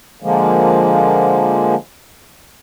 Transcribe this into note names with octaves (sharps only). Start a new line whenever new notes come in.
D3 F3 G#3 A#3